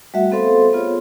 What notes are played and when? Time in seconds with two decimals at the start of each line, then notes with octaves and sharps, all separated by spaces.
0.14 G3 A3 F#4 E5 F#5
0.32 B3 C4 A4 C5 F5 C6
0.73 B3 F4 G#4 C#5